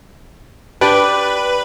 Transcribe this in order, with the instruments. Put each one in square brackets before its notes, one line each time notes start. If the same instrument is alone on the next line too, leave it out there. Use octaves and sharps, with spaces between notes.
[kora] D4 G4 D5 [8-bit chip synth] B4